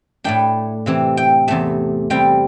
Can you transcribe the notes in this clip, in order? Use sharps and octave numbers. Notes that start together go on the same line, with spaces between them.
A2 A3 D4 G5
C3 E3 C4
G5
E2 C3 A3 A5
C3 G3 C4 G5